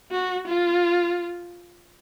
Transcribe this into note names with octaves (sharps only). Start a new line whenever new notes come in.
F#4
F4